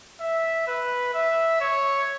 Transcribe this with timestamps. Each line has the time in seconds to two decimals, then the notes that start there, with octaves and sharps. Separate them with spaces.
0.20 E5
0.67 B4
1.14 E5
1.61 C#5